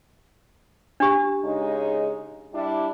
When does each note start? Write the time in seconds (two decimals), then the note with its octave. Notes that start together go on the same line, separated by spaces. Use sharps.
1.00 D4 G4
1.43 C#3 G#3 D#4
2.54 G3 D4 E4